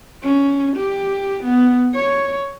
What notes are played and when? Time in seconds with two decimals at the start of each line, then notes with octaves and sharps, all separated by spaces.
0.23 C#4
0.77 G4
1.44 B3
1.95 C#5